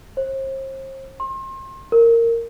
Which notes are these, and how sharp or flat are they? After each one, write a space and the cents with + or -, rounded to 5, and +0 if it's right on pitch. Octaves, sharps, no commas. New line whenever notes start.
C5 +40
C6 +35
A#4 -15